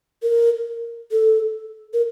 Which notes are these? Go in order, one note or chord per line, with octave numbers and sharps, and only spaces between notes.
A#4
A4
A#4